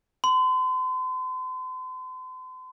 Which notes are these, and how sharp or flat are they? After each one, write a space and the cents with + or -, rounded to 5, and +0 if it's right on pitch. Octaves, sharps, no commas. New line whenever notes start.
C6 -40